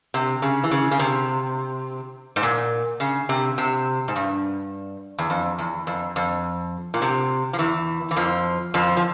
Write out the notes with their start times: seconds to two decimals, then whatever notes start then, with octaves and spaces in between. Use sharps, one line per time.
0.14 C3
0.42 C#3
0.64 E3
0.71 C#3
0.91 C#3
0.99 C3
2.36 G#2
2.43 A#2
3.00 C#3
3.29 C3
3.58 C3
4.08 G#2
4.16 G2
5.18 E2
5.30 F2
5.58 E2
5.87 F2
6.16 F2
6.94 A#2
7.02 C3
7.53 F3
7.59 E2 E3
8.11 E3
8.16 F2 F3
8.74 F2 F3
8.97 F3